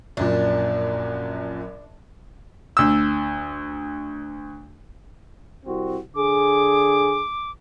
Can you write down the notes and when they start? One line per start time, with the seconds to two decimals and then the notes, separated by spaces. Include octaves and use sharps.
0.17 A#1 F#2 A#2 D4
2.77 D2 E6
5.66 C2 C4 F#4
6.15 D3 G#4 D6